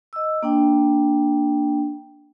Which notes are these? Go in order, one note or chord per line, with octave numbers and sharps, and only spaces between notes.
D#5 E6
A#3 D4 G5